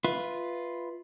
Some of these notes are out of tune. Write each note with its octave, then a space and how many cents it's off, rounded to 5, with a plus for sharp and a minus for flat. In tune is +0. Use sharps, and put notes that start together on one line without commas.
F4 +0 B4 +0 E5 -15